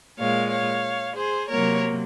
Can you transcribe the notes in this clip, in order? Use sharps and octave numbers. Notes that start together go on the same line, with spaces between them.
A#2 G#3 C#5 F5
C#5 F5
G#4 C5
C3 F#3 A#3 A#4 C#5